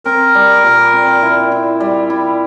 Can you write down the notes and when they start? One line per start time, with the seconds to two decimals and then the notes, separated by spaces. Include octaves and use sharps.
0.05 C4 A#4
0.35 G3
0.64 A#2
0.93 C4
1.23 E4
1.52 E4
1.80 G3
2.10 E4